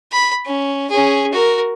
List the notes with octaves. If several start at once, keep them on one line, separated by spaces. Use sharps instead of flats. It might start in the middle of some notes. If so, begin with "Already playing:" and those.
B5
C#4
C#4 G#4
F#4 A#4